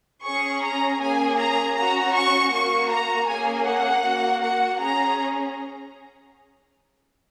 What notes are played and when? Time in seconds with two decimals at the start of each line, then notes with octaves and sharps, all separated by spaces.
0.24 C#4 G#4 C#6
0.63 A#5
1.00 A#3 C#4 G#4 G#5
1.38 A#5
1.76 C#4 F#4 A#5
2.14 C#6
2.52 A#3 F#4 C#6
2.90 A#5
3.28 A#3 C#4 G#4 G#5
3.66 F#5
4.04 A#3 F#4
4.42 F#5
4.80 C#4 G#4 A#5